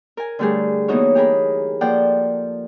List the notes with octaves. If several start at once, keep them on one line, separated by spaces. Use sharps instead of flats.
A#4 G#5
D3 G3 A3 G4 G#4
E3 A#3 B3 D#4 F#4 C#5
G4 G#4 A#4 B5
F3 A#3 A4 D5 F#5 G5